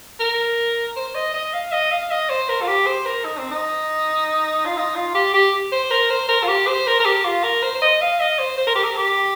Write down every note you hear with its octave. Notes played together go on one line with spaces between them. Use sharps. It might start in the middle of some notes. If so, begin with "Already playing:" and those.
A#4
C5
D#5
D#5
F5
D#5
F5
D#5
C5
A#4
F4
G4
C5
A#4
D#4
C4
D#4
F4
D#4
F4
G4
G4
C5
A#4
C5
A#4
F4
G4
C5
A#4
A#4
G4
F4
A#4
C5
C5
D#5
F5
D#5
C5
C5
A#4
G4
A#4
G4